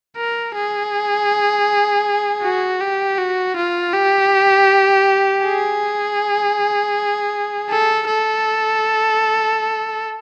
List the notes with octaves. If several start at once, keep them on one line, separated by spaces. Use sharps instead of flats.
A#4
G#4
F#4
G4
F#4
F4
G4
G#4
A4
A4